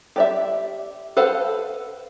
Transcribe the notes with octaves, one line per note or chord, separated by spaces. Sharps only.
G4 D5 E5
A4 B4 C5 F5 F#5